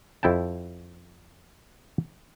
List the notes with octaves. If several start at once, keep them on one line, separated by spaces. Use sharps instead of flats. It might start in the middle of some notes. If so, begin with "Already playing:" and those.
F2 E4 G5 A5